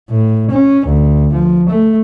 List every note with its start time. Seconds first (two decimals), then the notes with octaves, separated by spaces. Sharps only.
0.10 A2
0.51 C#4
0.87 D2
1.33 F3
1.69 A3